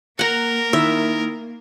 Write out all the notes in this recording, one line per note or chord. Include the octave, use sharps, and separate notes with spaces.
A#3 A#4 F#5 A#5
D#3 E4 E5